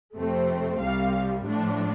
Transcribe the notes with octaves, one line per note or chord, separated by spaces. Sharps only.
F2 C3 A3 C4
C2 C3 G3 F5
A2 F3 D4